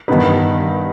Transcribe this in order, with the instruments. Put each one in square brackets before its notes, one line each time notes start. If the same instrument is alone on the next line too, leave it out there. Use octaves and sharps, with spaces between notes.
[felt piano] G2 D#3 B3 D#4 B4